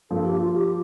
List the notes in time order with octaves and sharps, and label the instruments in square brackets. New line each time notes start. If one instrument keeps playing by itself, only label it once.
[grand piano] G2 F3 A#3 [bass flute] A4
[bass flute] G4
F4
G4